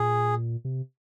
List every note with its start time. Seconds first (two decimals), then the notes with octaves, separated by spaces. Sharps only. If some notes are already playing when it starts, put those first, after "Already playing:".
Already playing: A#2 G#4
0.65 C3